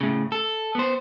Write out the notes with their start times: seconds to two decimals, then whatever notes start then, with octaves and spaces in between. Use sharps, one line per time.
0.01 A2 C#3
0.32 A4
0.75 B3 C5